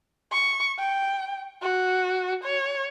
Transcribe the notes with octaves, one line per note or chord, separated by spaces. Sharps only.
C#6
G5
F#4
C#5